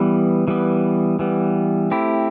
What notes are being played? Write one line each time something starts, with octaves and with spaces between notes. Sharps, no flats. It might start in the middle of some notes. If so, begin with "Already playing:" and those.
Already playing: E3 G3 B3
E3 G3 B3
E3 G3 B3
A3 C4 E4 G4